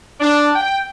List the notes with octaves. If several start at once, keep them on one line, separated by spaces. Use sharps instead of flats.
D4
G5